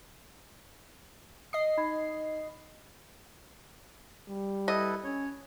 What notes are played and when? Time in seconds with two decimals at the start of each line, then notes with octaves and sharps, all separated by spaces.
1.53 D#5 D#6 C7
1.77 D#4 B5 G#6
4.28 G3
4.68 E4 A4 B4 D#5
5.04 C#4 C#5